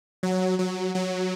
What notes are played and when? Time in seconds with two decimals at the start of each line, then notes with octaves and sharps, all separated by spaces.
0.23 F#3
0.59 F#3
0.95 F#3